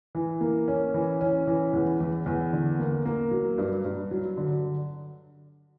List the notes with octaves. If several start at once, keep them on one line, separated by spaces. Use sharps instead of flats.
E3
A#3
C#4
E3
C#4
E3
E2
E2
E2
D3
A#3
A#3
F#3
G2
G2
F#3
D3